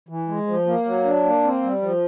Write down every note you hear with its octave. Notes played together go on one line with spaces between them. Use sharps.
E3
G#3
F3
A#3
F#3
D4
A#3
C4
G3
F3